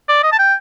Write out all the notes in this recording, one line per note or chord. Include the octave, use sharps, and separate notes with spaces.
D5
D#5
A5
G5